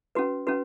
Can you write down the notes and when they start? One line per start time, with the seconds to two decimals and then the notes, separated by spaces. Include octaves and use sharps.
0.15 C#4 F#4 B4
0.47 C#4 F#4 B4